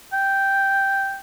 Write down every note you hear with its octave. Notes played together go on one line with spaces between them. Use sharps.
G5